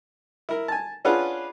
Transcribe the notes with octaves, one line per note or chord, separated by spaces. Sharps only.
E4 A#4
G#5 A5
C#4 D4 F4 G#4 B4 F#5